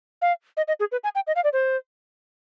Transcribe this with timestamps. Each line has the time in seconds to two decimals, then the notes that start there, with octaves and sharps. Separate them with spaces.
0.22 F5
0.57 D#5
0.68 D#5
0.80 G#4
0.92 B4
1.04 G#5
1.15 G5
1.27 D#5
1.36 F5
1.44 D5
1.53 C5